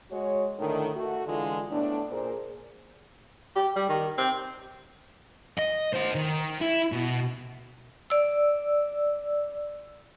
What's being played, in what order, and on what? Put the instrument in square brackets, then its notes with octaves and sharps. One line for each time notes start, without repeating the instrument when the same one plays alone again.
[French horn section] G#3 F#4 C#5
A2 D3 D#3
A3 F#4
D3 E3 G#3 F4
A2 B3 D4
A#2 G#4 A#4 C5 D5
[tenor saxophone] G4
G3
D#3
C4
[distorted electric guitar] D#5
F#4 C5
D#3
E4
B2
[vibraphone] D5 E6